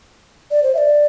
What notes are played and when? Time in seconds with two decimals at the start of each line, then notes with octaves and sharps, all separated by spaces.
0.51 D5
0.63 C5
0.74 E5
0.78 D5